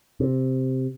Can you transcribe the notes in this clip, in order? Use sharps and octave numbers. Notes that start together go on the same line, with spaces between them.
C3